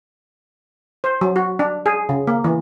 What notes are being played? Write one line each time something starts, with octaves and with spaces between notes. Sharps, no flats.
C5
F#3
F#4
D4
G#4
C#3
A#3
E3